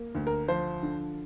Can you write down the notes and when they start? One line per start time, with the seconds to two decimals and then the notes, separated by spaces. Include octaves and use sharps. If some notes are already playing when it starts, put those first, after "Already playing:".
Already playing: A#3
0.15 D2
0.27 A#4
0.48 F3 C5
0.83 D3